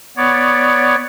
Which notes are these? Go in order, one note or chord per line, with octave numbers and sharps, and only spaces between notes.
B3 C#5 D5